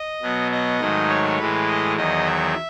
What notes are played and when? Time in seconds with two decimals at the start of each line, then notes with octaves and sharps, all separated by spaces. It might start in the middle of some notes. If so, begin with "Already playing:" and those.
Already playing: D#5
0.22 B2 F#3 B3
0.51 D#5
0.80 G#2 D#3 F#3 A3
1.09 C#5
1.39 A2 E3 G#3 B4
1.68 D#5
1.96 E2 D#3 F#3 D#5
2.26 E5